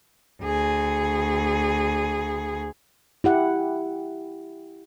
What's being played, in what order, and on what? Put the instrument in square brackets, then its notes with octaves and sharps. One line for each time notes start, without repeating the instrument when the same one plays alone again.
[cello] D2 G#4
[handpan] E4 G4 F#5